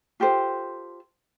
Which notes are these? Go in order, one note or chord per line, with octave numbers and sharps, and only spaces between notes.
F4 G4 A4 C5